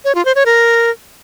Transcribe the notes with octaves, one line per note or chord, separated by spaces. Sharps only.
C#5
F4
C5
C#5
A#4